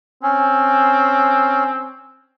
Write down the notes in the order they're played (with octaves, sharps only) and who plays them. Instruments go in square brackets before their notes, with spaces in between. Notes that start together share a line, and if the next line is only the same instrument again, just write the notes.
[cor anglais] C4 [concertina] C#4